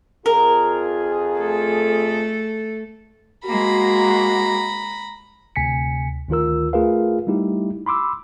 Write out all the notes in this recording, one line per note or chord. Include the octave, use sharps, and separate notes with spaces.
F2 F4 G#4 A#4
A3 A4
G#3 A#3 F#4 A#5 B5
D2 C3 G#5 B6 C#7
D2 D#3 F4 A#4 E6
A3 F4 G#4 A#4 B4 F5
G3 A3 D#4 E4 G4
B5 C6 D6 E6